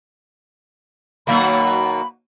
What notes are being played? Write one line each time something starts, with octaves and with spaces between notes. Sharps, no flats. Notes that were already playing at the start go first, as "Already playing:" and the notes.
B2 D#3 F#3 A#3 F#4 B5